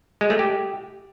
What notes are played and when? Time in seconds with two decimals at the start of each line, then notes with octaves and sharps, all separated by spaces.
0.21 G#3
0.30 A3
0.39 G4